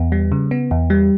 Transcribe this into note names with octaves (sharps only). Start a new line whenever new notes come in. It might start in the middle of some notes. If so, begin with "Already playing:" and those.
Already playing: E2 B3
G3
C#3
B3
E2
G3